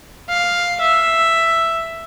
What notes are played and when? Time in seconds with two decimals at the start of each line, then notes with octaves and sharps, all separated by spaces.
0.30 F5
0.81 E5